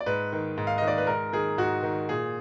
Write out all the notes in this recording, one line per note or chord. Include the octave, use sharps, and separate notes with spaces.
D5
G#2 B4
D#3
G#2
F5
D#3 D#5
D5
B4
G#2 A#4
D#3 G#4
G#2 F#4
D#3
A#2 G#4